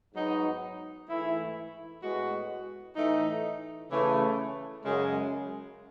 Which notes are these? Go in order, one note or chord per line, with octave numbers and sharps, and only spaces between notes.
G#2 F#3 B3 D#4 F#4
G#2 E3 A3 E4
A2 G#3 B3 F#4
A2 E3 A3 D#4
C#3 E3 A3
F#2 C#3 G#3